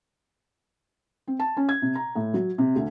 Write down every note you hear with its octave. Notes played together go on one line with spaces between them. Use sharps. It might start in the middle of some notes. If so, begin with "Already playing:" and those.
C4
A5
C#4
G#6
C3
A#5
A2
F#3
C3
D2